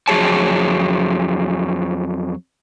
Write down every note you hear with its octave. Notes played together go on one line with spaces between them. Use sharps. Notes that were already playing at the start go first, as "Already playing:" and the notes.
F2 F#3 G#4 C#5 A5